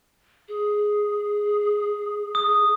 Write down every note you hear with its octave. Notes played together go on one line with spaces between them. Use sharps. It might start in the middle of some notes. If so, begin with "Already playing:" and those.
G#4
D#6